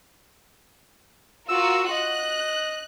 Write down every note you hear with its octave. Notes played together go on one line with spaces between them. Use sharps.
F4 F#4 A#4 E6
D#5 F#6